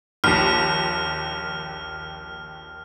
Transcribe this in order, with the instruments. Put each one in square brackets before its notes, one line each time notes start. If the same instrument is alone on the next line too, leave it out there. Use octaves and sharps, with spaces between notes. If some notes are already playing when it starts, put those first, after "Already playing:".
[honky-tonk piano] A#1 D#2 [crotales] F6